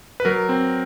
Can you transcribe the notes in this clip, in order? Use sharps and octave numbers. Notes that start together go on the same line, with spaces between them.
B4
F#3 A#4
C4